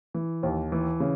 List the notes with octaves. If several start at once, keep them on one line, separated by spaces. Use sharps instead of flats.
E3
D#2
E3
C#3